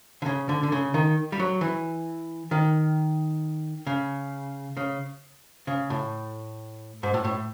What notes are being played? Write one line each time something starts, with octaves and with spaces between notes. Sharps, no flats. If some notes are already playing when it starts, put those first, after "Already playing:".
D3
C#3
D3
D3
C#3
D#3
G3
F#3
E3
D#3
C#3
C#3
C#3
A2
G#2
A2
A2